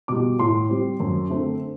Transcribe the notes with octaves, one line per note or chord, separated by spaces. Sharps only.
B2 G3 D6
A2 C6
G3 C4
F#2
D3 A3 C4